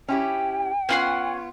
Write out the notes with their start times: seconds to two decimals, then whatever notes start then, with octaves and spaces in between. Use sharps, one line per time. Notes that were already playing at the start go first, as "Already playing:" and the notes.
0.08 C#4 E4 G4 G5
0.89 B3 C#4 F4 F#5 C6